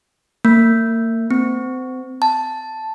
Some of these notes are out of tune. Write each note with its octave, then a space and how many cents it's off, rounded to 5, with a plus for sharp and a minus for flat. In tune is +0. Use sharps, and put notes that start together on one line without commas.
A#3 -35
C4 -30
A5 +0